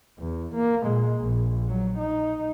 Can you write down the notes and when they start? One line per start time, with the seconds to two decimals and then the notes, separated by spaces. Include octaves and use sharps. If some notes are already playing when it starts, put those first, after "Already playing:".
0.19 E2
0.54 A#3
0.84 A#2 G#3
1.21 A#1
1.68 F#3
1.99 D#4